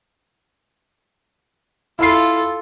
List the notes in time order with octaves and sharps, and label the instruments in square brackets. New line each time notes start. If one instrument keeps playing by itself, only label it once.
[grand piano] E4 B5 C7 [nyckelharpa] F4 A4